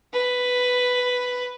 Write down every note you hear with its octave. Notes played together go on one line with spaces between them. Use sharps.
B4